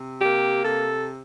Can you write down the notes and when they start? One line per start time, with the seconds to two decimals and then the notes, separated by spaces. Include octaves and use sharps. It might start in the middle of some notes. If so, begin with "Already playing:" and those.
Already playing: C3
0.22 A#3 G4
0.64 C3 A4